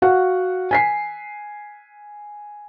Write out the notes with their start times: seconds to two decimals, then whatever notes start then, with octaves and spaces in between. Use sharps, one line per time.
0.02 F#4 F5 F#5
0.71 G#5 B6 C7